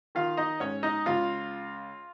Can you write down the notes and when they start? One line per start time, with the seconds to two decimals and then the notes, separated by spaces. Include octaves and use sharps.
0.15 D#3 F4 F5
0.37 D#4 D#5
0.60 G#2 C#4 C#5
0.83 D#4 D#5
1.06 C#2 F4 F5